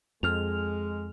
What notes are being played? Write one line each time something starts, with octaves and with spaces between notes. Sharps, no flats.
F2 G#3 F6 F7